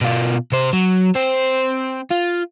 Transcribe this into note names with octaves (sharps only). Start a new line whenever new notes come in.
B2 F4
C3 C5
F#3
C4 C5
F4